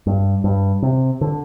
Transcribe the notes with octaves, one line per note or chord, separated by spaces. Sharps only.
G2
G2
C3
D3